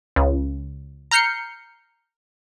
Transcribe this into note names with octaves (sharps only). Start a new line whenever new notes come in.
C#2 C#3
A#5 F6 G6 C7 C#7